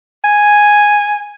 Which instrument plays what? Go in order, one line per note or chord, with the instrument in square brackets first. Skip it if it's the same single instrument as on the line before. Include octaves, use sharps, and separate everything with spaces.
[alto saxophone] G#5